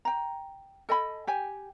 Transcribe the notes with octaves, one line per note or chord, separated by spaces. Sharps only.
G5 A#5
A4 D#5 G#5 B5
G4 G5 G#5